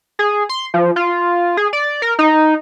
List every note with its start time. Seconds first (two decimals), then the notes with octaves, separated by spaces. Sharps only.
0.19 G#4
0.49 C6
0.74 F3
0.96 F4
1.57 G#4
1.73 D5
2.02 A#4
2.19 D#4